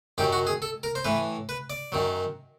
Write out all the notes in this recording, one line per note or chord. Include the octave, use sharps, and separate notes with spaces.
F#2 D#3 F#3 G4
F#4
G#4
A4
A#4
C5
A2 E3 B4
B4
D5
F#2 D#3 F#3